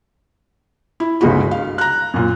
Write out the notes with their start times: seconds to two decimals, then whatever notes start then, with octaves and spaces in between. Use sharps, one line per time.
1.00 E4
1.21 G1 C#2 C#3 G#3 F#4 B5
1.51 F5
1.78 A#5 F#6
2.14 F#2 A#2